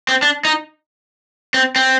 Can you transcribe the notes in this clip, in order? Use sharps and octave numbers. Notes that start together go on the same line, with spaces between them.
C4
D4
D#4
C4
C4